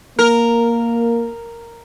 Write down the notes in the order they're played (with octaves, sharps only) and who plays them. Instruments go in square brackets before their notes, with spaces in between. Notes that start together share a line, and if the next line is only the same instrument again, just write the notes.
[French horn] A#3 [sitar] A#4